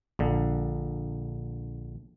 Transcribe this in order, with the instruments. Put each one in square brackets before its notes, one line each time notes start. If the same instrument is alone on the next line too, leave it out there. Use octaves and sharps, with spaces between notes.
[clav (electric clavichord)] A#1 D3